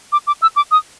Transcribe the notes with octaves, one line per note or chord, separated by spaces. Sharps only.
D6
D6
E6
D6
D#6